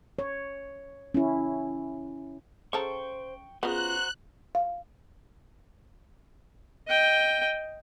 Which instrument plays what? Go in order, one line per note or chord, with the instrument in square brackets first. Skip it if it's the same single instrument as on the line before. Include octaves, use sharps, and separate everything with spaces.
[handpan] C#5
C#4 E4
[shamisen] C#3 A4 A#5 [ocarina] C5 [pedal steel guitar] G5 C#6
[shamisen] C#3 B3 [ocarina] F4 [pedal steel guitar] F#4 C5 A#5 [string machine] F#6
[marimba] F5
[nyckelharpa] D#5 G5